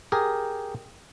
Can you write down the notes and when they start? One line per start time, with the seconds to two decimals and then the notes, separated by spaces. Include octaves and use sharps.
0.12 G4 G#4 A#4